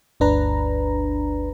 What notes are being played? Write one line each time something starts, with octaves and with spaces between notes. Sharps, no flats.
G1 D2 D4 B4 A#5